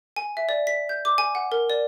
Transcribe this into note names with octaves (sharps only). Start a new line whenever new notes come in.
G#5
E5
D5
B6
G6
D6
G#5
F#5
A#4
D5